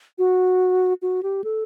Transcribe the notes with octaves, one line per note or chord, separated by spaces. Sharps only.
F#4
F#4
G4
A4